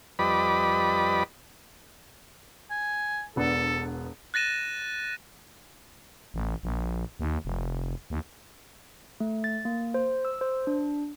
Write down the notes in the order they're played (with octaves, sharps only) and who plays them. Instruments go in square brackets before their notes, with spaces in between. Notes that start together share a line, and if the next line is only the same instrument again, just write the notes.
[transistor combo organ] F2 G3 B4 D5 D#5 B5
[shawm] G#5
[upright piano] E1 B3 D4 [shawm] A4
[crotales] F#6 A6 A#6 D#7 E7
[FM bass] A1
A#1
D#2
F1
D#2
[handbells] A3
A6
A#3
C5
E6
C5
D4